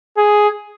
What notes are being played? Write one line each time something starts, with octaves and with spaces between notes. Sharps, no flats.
G#4